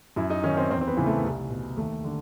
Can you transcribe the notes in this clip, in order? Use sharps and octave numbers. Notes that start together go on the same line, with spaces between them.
F#2 E4
D#4
D#3 C#4
C4
E2 C4
C4
B3
C#3 E3
A3
C2
B2
D#2 A3
D3